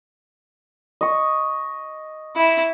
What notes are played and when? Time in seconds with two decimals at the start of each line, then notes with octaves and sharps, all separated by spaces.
1.01 D#5 C#6
2.36 E4